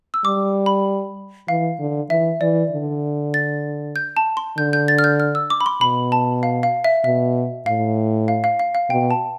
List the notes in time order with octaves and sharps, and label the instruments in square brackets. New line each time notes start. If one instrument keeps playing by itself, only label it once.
[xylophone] E6
[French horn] G3 [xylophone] D6
[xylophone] B5
[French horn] E3 [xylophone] F5
[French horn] D3
[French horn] E3 [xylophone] E5
[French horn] E3 [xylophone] D5
[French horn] D3
[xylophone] A6
G6
A5
C6
[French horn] D3 [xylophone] G6
[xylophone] G6
A6
F6
G6
F6
E6
D6
B5
C6
[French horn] B2 [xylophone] B5
[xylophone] A5
F5
F5
E5
[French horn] B2 [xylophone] E5
[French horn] A2 [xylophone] F5
[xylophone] F5
F5
F5
F5
[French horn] B2 [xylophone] G5
[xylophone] A5